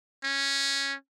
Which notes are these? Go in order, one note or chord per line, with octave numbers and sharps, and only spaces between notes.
C#4